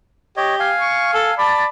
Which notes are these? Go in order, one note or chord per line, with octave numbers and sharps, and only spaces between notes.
G4 C#5 D#5
F5 G#5
C#6
A4
D5 A5 B5